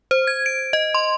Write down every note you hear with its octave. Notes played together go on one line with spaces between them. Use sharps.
C5
G#6
D7
D#5
C6